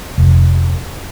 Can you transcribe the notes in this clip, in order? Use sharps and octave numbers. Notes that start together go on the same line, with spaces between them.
F1